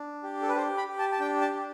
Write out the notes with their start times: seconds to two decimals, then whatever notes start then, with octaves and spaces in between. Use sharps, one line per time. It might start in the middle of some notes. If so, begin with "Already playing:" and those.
Already playing: D4
0.23 G4
0.42 A4
0.49 B4
0.56 G4 C5
0.77 B5
0.88 G4
0.99 A5
1.12 A5
1.20 D4 G5
1.41 A5
1.53 D4